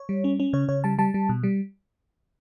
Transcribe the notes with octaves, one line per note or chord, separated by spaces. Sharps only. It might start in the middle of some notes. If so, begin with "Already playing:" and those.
Already playing: C#5
G3
C#4
C#4
C#3 C#5
C#3 C#5
G3 A5
G3 A5
G3
B2
G3